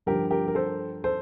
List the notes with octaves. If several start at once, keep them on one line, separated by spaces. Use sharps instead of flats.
G2 D3 F3 G4 A#4
G4 A#4
A#4
A4 C5
A4 C5